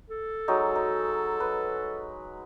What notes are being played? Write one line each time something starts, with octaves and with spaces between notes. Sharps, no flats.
A4
F#3 G#3 D#4
D#4
B4